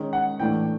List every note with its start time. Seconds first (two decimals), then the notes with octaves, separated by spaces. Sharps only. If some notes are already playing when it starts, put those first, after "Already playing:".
Already playing: D#3 G#3 C#4
0.13 F#5
0.40 A2 E3 A3 D4 G5